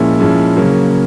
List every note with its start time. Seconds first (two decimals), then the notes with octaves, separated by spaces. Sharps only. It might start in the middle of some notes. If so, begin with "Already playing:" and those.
Already playing: A#2 F3 G#3 C#4 E4
0.19 A#2 F3 G#3 C#4 E4
0.57 C#3 F#3 A#3 C#4